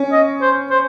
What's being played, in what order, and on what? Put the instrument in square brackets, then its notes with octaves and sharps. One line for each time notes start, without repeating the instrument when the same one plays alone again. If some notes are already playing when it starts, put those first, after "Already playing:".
Already playing: [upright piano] C#4
[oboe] D#5
C5
C5